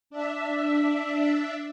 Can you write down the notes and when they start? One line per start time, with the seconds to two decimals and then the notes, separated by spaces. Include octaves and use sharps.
0.10 D4 E5